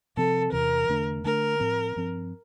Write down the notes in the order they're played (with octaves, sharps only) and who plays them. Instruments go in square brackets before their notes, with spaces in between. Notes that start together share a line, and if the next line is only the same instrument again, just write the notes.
[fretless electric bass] C3 F3 C4 [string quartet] A4
[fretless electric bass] E2 C3 E3 [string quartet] A#4
[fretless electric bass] E2 D3 A3 D4
[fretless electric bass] D3 A3 D4 [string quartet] A#4
[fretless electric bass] A2 F3 C4
G2 F3 C4